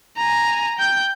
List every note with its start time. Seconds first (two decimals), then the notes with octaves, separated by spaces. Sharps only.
0.17 G#5 A#5
0.78 G5 G6